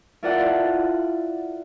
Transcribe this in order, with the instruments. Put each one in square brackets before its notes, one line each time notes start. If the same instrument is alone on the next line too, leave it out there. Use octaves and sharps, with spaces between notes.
[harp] E4 F4 A4 A#4 D5 F#5